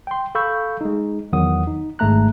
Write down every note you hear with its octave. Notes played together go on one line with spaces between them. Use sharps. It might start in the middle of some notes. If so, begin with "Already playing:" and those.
G5 C6
A4 F5 B5 C#6 E6 G6
G#3 D#4
E2 D#3 F#3 F#5 D#6
D#4
G#1 G#2 G#3 A3 A#5 F#6